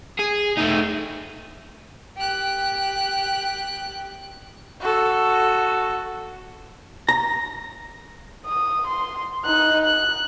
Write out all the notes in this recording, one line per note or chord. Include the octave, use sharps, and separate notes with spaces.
G#4
A3 D#4
G4 F#6
F#4 A4
A#5
D#6
C6
D#4 F#6
F#6